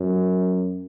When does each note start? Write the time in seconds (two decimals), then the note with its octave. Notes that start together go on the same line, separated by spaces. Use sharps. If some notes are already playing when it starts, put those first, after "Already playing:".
Already playing: F#2